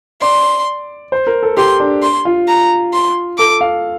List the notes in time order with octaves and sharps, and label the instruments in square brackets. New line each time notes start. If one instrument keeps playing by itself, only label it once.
[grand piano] D5 [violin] C6
[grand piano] C5
A#4
A4
[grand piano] G4 [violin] C6
[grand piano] D4
[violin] C6
[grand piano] F4
[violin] A#5
C6
[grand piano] A4 [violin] D6
[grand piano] F5